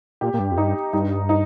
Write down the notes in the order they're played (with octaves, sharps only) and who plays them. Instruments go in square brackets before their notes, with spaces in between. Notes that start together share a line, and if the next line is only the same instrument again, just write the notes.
[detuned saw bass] A#2 [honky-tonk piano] G4
[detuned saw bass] A#2
G2
F2
[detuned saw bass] G2 [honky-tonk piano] D#4
[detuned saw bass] G2 [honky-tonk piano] D#4
[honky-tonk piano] D#4